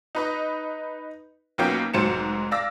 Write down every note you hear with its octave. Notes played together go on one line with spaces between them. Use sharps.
D#4 B4 D#5
B1 F#3 A#3 B3 C#4 G5
F1 G#2 F#3 C5 C#7 E7
D5 F5 D6 E6 A#6